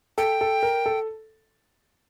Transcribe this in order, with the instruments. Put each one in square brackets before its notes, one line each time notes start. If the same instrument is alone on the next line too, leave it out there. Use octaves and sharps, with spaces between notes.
[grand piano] A4 [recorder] G5
[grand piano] A4
A#4
A4